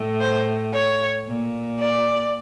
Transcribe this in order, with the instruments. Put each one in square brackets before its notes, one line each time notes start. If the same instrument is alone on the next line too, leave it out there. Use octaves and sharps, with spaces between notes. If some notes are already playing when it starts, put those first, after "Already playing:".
Already playing: [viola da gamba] A2
[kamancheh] C5
C#5
[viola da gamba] A#2
[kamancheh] D5